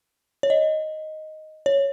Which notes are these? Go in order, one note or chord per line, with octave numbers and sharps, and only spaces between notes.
C#5
D#5
C#5